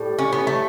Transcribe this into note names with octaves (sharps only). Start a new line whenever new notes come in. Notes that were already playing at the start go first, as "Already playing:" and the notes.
Already playing: A2 G3
C#4
B3
A3